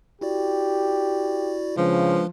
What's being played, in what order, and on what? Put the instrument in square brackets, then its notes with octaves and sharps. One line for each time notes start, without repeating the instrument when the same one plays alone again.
[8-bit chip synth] E4 F#4 D5 [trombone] G4
[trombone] C#3 [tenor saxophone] F3 [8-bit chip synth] G#3 D4 B4